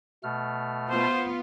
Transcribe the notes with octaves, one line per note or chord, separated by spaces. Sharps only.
B2 A3 F6
B3 F4 C5